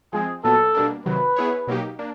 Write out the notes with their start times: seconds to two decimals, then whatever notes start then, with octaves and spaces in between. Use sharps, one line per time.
0.13 F3 G#3 C4 G#4
0.44 A#2 F#3 B3 A4
0.75 B2 G3 A#3 D4
1.06 C3 D#3 F#3 B4
1.36 B3 E4 G#4 C#5
1.67 B2 F#3 A#3 D#4 G4
1.99 A#3 D4